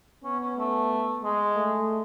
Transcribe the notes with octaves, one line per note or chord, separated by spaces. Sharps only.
B3 C#4
C#4
A3
G#3
A3